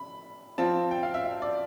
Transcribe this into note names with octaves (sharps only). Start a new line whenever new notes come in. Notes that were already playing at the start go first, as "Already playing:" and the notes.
Already playing: B5
F3 C4 F4 A5
G5
F5
E5
E5
D5